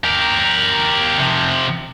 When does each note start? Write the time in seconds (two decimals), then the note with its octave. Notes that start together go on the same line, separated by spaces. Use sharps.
0.04 G4 A#4
1.19 C3 F3